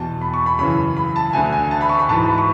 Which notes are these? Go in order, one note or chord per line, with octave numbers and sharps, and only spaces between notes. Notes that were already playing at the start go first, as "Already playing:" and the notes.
Already playing: E2 B2 A5
B5
C#6
B5
F#2 C#3 E3 B5
B5
A5
D2 D3 G#5
G#5
A5
B5
C#6
B5
G#2 E3 A5
B5
C#6